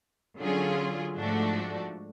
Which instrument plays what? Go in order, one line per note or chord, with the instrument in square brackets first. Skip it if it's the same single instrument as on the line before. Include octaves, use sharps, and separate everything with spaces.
[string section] D3 F#3 C#4 F4 G#4
G#2 F3 A3 D4 F#4